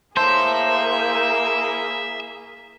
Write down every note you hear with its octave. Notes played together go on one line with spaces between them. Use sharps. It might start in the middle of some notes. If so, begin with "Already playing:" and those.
A#3 E4 G#4 C5 E5 A5